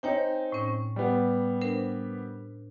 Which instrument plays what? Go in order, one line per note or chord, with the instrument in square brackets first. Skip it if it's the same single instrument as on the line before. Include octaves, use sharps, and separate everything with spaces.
[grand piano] C4 D#4 [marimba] C#5 G5 G#5
[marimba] A2 C#4
[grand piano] G3 B3
[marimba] D4 A#4 C5